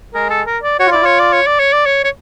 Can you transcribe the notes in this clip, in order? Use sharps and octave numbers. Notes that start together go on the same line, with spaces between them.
G#3 G#4 A#4
A4
A#4
D5
F#4 C#5
F4
E4 D5
F4 C#5
D5
C#5
D5
C#5
D5
C#5
C#5